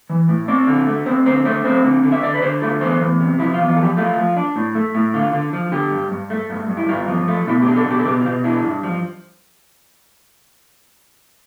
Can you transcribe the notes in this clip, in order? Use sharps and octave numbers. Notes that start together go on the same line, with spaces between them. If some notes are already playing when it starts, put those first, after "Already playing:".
E3
A2
C4 D5
D3
A3
C4 C5
D3 C5
A3 C5
C4 C5
D3
D3
E5
D3 D5
B4
D3 C5
A3 F4
E2 C5
E2
C3
F3 E4
F4
E2
F4
F3 A4
G4
A3 F4
F3
D4
A2
A3
A2
D3 F4
D3
F3
D3 G4
G2
G2
A3
G2
G2
E4
G2 F4
F3
A3
B2 E4
G4
D4
A4
B2 G4
A4
B2 G4
F4
B2 G4
D4 E4
G2
F3